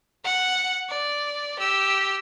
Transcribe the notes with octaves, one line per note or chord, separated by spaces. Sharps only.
F#5
D5
G4 E6